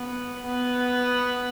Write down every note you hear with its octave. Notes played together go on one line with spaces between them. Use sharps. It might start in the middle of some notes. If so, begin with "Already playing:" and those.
Already playing: B3
B3